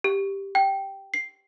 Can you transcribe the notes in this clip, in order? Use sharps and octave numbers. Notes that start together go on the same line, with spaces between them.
G4
G5
C7